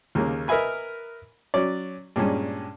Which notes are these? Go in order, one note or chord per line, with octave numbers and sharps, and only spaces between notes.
D#2 C#3 A#3
A#4 B4 D#5 E5 G#5 B5
F#3 C#4 D5
G2 A#2 G#3 C#4